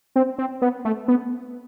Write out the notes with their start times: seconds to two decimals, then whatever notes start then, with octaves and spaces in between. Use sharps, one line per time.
0.16 C4
0.38 C4
0.62 B3
0.85 A3
1.08 B3